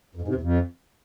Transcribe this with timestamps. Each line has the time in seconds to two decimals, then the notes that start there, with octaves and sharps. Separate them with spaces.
0.15 F2
0.22 G#2
0.28 C3
0.34 E2
0.41 F2